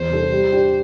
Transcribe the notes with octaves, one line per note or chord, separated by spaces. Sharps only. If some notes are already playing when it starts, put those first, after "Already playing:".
Already playing: E2 C5
C3 G3 D4 A4
G3
D4 G4